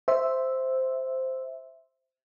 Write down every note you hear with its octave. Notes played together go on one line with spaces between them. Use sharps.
C5 E5